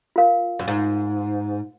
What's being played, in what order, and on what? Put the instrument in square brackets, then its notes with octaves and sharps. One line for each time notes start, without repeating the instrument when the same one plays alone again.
[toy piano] F4 A#4 F5
[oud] F#2
G#2